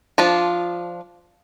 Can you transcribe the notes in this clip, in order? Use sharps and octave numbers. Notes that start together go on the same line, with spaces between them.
F3 D4 F4